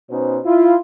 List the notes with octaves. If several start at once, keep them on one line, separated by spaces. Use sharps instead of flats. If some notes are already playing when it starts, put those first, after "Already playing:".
B2 C#4 D#4 C5
E4 F4